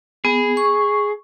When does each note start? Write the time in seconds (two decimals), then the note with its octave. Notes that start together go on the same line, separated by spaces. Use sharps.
0.25 B3 G#4
0.57 C#6